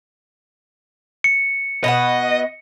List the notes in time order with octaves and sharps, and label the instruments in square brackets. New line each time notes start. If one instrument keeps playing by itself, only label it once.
[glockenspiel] C#7
[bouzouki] B2 B4 F#5 [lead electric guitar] D#5